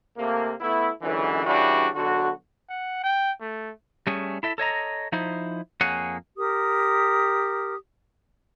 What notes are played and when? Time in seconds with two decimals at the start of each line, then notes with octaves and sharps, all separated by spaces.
0.17 C3 A3 A#3
0.61 A3 B3 E4
1.02 C#2 F#2 D3 E3
1.46 C#3 E3 G3 D4 F#4
1.95 B1 D3 F#4
2.69 F#5
3.04 G5
3.41 A3
4.07 G3 A3 C#4 G#4
4.43 E4 A4 E5
4.58 A4 C#5 D#5 A#5
5.12 F3 D#4 E4 C5
5.81 F2 A#3 G#4 C#5 F#5 G#5
6.37 G4 A#4 D#6